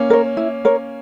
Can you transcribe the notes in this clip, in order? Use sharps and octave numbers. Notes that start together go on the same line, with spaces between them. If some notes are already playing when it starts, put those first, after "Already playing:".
Already playing: A#3 C#4
A#4 C#5
E4
A#4 C#5